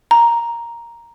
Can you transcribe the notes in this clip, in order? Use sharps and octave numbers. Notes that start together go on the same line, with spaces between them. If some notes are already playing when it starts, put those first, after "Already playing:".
A#5